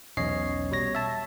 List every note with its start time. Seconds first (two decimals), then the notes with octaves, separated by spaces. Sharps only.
0.17 B1 E2 C#4 C#5 D#5 C7
0.71 B2 G3 C#5 A#6
0.95 E5 A5